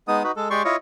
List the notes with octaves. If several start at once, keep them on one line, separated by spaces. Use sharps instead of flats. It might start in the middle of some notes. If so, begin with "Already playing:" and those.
G#3 B3 D#4 D#6
D#4 F#4 B4
G#3 A4
G#3 G4 D5 C6 C#6
E4 F4 C#5 D#5